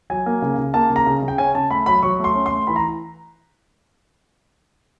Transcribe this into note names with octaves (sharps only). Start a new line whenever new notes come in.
F#3 G#5
A#3
C#3
C#3
A#3 A5
C#3
A#5
C#3
C#3
G5
C#4 G#5
C#3 A5
A3 B5
F#3 B5
F#3 C#6
A3
C6
C#4
C6
A3
E3 B5
A#5